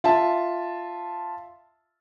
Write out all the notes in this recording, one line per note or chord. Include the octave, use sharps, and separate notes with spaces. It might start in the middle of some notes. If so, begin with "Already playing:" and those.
F4 E5 A5